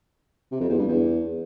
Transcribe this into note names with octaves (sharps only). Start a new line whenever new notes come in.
C3
F2
E2
G2
E2